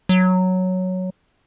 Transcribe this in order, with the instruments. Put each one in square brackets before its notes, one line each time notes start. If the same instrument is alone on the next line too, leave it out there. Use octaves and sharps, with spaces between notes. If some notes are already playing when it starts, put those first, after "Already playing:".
[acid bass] F#3